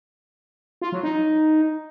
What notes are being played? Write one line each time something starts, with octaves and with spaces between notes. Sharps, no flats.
F4
F#3
D#4